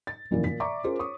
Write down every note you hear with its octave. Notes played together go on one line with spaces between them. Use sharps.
A6
F1 F#2 A#2 D#3 E3 E4
A#2 B6
D5 E5 A#5 C#6 D6
C#4 F4 G#4 A#4 C5
C#5 C#6 D#6